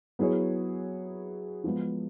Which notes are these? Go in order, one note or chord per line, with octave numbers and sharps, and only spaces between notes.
F#3 B3 E4 G#4 C#5
F3 G#3 B3